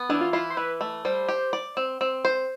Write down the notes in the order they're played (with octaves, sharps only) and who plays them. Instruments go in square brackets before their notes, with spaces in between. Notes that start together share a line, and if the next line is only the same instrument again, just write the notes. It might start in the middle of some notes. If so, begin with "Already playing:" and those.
Already playing: [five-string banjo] B3
[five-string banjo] E3 [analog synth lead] D4
[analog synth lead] F4
[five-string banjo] E4 [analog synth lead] F4
[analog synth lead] C5
[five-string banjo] E3 [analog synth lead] B4
[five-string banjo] A3
[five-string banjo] G3 [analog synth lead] C5
[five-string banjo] G4
D5
C4
C4
C5